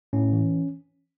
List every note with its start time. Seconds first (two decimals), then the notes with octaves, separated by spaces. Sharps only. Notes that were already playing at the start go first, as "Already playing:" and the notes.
0.13 A2 C#4
0.33 E3